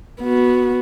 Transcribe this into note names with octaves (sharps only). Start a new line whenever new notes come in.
B3 F#4